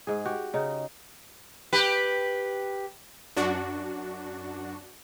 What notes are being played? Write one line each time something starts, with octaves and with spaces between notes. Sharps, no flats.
G#2 G#4
F#4 G4
C#3 D#4
G4 B4
F#2 D4 F#4